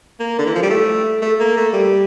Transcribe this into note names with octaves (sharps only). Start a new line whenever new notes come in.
A#3
D3
E3
F3
G3
A3
A3
A#3
A3
G3